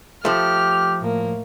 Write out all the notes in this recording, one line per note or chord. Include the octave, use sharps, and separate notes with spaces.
F3 A3 G4 F6
A2 A#3